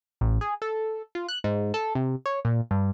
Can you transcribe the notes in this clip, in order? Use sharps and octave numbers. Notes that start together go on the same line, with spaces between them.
A1
G#4
A4
F4
F#6
G#2
A4
C3
C#5
A#2
G2